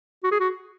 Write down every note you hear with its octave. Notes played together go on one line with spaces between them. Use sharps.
F#4
G#4
F#4